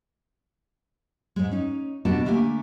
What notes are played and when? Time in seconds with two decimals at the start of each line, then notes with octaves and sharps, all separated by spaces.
1.36 G#2 G#3
1.51 C#4 D#4
2.05 B2 B3 D4 F#4 G4 A5
2.25 D3 A3 A#3 G4 G#5